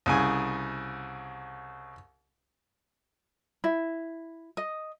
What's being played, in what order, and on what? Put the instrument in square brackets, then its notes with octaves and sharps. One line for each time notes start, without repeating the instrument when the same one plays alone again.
[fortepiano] C2 C#3 G#5
[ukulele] E4
D#5